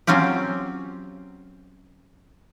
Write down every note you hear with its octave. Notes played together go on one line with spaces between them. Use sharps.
F#3 C4 C#4 F4 G4